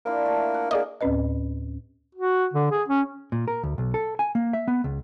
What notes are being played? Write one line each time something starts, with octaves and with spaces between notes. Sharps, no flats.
A#3 D4 E4 F4
A3
F#5
A#3 G#4 D5 D#5
D2 A2 C4 C#4 B4 D#5
F#4
D3
G#4
C#4
A#2
A#4
D2
B1
A4
G#5
A#3
E5
B3
C#2